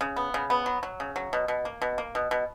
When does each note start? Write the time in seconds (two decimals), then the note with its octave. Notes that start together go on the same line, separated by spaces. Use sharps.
0.01 C#3
0.16 B3
0.34 C#3
0.50 B3
0.66 F#3
0.83 F#3
1.00 C#3
1.16 F#3
1.33 B2
1.48 B2
1.65 A#3
1.82 B2
1.98 A#3
2.15 B2
2.31 B2